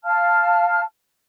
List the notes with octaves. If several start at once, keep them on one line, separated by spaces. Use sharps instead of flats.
F5 A5 F6